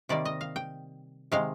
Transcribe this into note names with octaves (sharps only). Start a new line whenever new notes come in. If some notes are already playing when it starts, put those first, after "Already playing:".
C3 D#3 G3 A#3 D5
D#5
F5
G5
C3 D#3 G#3 F5